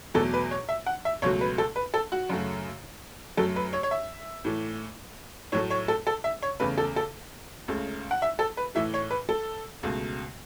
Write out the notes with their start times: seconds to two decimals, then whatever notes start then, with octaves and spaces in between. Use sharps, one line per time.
0.14 E2 B2 F#3 A3 A4
0.34 B4
0.51 C#5
0.69 E5
0.86 F#5
1.05 E5
1.22 C#2 B2 F#3 A3 C#5
1.41 B4
1.58 A4
1.76 B4
1.94 A4
2.12 F#4
2.29 F#2 C#3 A3
3.37 F#2 F#3 A3 A4
3.56 B4
3.73 C#5
3.83 C#5
3.91 E5
4.45 A2 E3 A3
5.52 A2 F#3 A3 C#5
5.70 C#5
5.88 A4
6.07 A4
6.24 E5
6.43 C#5
6.60 E2 C#3 A3 B4
6.78 A4
6.96 A4
7.68 C#2 C#3 A3
8.11 F#5
8.22 E5
8.39 A4
8.57 B4
8.75 A2 E3 A3 E5
8.94 C#5
9.11 B4
9.29 A4
9.83 C#2 B2 A3